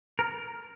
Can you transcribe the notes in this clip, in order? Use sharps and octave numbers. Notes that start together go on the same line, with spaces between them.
A#4